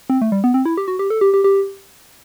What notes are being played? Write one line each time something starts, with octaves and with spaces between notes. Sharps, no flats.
C4
A3
G3
B3
C4
E4
G4
F#4
G4
A4
G4
G4
G4